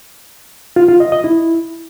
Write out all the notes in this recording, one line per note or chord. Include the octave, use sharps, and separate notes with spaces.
F4
F4
D#5
D#5
E4